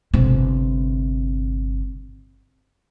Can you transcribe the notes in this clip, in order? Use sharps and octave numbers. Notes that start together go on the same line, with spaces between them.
G1 C3